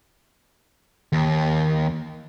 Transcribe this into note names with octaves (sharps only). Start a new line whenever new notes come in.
D#2